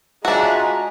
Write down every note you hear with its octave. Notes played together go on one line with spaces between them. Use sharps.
G#3 D4 F4 F#4 E5 A#5